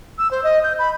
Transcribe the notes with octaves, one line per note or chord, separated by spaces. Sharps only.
E6
C5
D#5
G6
B5